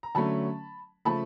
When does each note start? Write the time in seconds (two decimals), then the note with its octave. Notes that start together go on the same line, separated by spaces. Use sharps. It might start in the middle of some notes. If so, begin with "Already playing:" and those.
0.03 A#5
0.15 D3 F#3 A3 C#4 A5 B5
1.05 C#3 F3 A3 A5 B5